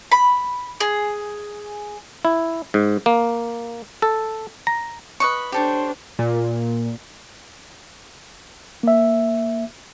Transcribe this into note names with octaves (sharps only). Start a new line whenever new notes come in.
B5
G#4
E4
G#2
A#3
A4
A#5
B4 D#5 C#6
D4 G4 A4 C5 C#5
A#2
A#3 E5